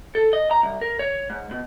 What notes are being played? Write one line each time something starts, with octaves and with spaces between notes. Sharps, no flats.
A4
D#5
A#5
C2
A#4
C#5
G#2
B2